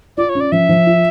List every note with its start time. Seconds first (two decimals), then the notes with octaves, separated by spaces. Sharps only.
0.17 F4 D5
0.29 C#5
0.35 C#4
0.40 D5
0.52 F3 E5
0.69 F3
0.87 F4